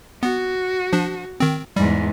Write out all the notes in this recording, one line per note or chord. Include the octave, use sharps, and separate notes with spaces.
B3 F#4
F3 D4
D#3 C4
E2 G#2 G3